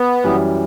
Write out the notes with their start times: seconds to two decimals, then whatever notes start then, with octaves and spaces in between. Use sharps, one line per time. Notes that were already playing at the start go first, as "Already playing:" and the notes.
Already playing: B3
0.24 F#2 E3 G3